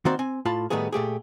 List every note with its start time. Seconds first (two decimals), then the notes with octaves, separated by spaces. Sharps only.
0.05 D#3 A#3 C4 F#4 C5 D5
0.19 C4 G#5
0.45 A2 F4 A5 B5
0.70 A2 D#3 G3 A3 B3 G#4
0.92 A#2 A3 G4 G#4